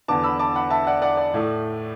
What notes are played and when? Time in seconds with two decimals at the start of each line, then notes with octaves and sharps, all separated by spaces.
0.08 E2 D3 B3 A5 D6
0.24 B5 E6
0.39 A5 D6
0.55 F#5 B5
0.70 E5 A5
0.87 D5 F#5
1.02 D5 F#5
1.17 D5
1.34 A2 A3